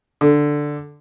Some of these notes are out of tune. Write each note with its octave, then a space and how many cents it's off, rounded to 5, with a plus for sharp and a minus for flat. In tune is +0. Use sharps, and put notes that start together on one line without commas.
D3 +5